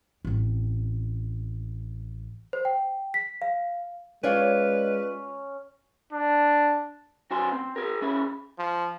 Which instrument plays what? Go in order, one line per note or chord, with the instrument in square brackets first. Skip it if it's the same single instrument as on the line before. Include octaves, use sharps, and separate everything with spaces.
[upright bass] A1 C4
[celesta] C5
G5
B6
F5
[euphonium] G#3 [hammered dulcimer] C#4 [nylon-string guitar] F4 C#5 D5 [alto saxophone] B4
[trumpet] D4
[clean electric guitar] F#2 F#4 C5 G#5 C6
C4
G#4 A#4
C#4 E4 G#4
[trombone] F3